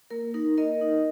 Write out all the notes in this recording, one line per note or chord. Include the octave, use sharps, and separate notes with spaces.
A#3 A#4
D#4 A#4
A#3 A#4 D#5
D#4